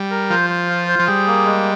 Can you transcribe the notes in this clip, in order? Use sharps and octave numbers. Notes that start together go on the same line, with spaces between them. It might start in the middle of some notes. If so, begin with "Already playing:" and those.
Already playing: G3
A#4
F3 C5
C5
F4
C5
F3
G3 G#4
A#3
G#3